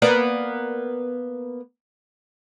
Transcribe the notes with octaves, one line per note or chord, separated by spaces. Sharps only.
A#3 B3 D5